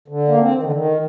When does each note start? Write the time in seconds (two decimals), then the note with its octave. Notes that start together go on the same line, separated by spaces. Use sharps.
0.08 D3
0.28 A#3
0.40 C4
0.55 D#3
0.63 D3
0.72 D#3